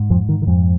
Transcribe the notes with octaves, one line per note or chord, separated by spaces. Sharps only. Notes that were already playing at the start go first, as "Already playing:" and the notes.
Already playing: G#2
F2 F3
D#3
D#3
F2 F3